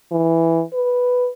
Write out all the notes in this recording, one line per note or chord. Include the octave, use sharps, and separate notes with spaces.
E3
B4